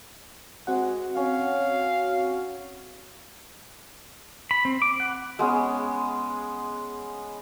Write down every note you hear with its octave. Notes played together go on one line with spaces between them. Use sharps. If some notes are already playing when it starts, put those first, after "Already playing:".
G#3 C4 F#4 F#5
C#4 F5
B5
C4
D6
F#5
G#3 B3 C#4 G#4